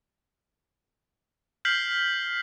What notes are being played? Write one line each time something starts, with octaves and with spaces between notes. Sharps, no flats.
F6 G6 B6 C7 F#7